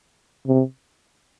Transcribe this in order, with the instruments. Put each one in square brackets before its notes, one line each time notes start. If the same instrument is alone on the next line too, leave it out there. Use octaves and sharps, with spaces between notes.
[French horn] C3